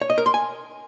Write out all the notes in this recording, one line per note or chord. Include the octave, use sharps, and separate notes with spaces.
C#5
D#5
A#4
C6
G#5